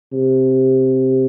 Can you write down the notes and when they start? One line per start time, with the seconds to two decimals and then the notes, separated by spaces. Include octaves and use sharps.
0.12 C3